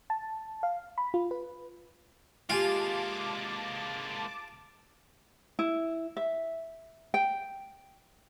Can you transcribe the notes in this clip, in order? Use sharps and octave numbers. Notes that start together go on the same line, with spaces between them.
A5
F5
B5
F4
B4
G#3 A#3 F4 G4 G#5 A5 D6 D7
E4
E5
G5